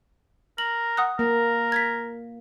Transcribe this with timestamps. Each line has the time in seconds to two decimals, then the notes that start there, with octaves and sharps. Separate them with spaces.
0.58 A#4 F#7
0.97 F#5 D#6 F#6
1.19 A#3 A#4
1.72 G#6 A#6 B6